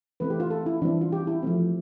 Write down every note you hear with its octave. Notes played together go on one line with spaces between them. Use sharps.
E3 A3 C4 B4
G4
F4
A4
E4
E3 G3 C4 D4
F4
G4
E4
F3 A3 C4